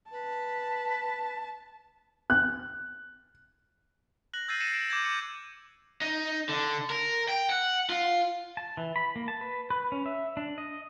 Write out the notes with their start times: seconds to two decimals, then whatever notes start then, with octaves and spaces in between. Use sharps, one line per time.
0.12 B4 A5
2.30 F#6
4.33 F#6 A#6 F#7
4.48 E6 G6 A6 A#6 C7 D#7
4.60 A#6 C7 C#7 D#7 E7
4.73 D7 E7
4.89 D6 G6 G#6 A#6 E7
5.05 D6 G#6 C#7
6.01 D#4
6.49 D3
6.90 A#4
7.29 G5
7.50 F#5
7.90 F4
8.57 A5
8.77 E3
8.96 B5
9.16 A#3
9.28 A5
9.41 B4
9.70 B4
9.92 C#4
10.06 E5
10.37 D4
10.58 D#5